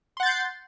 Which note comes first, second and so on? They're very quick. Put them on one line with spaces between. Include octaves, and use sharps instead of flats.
C6 F#5 A6 G6 C7